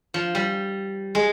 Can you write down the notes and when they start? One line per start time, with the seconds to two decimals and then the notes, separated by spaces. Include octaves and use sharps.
0.14 F3
0.35 G3
1.15 G#3